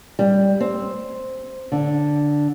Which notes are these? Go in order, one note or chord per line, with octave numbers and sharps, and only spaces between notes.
G3
C4
D3